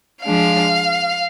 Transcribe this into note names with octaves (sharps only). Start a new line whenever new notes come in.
F3 G#3 D4 F5